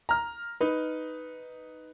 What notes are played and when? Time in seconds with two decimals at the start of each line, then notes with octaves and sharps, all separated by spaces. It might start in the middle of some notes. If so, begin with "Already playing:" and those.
0.09 A#5 F6
0.61 D#4 B4